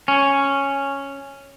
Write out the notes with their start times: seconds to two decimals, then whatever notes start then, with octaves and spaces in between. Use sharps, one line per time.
0.08 C#4